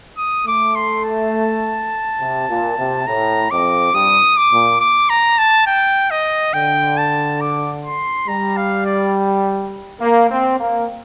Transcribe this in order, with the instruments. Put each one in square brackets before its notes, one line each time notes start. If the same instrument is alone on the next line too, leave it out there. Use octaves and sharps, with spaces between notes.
[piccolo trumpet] D#6
[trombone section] A3 [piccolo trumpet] D6
[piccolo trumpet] C6
A5
[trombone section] C3
A#2
C3
[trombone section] A2 [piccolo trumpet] A#5
[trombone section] F2 [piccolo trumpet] D6
[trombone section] G2 [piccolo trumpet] D#6
[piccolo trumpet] D6
[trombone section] A#2
[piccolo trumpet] D6
A#5
A5
G5
D#5
[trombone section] D3 [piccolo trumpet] G5
[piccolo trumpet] A5
D6
C6
[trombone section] G3 [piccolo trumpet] A#5
[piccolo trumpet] F5
D5
[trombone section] A#3
C4
A#3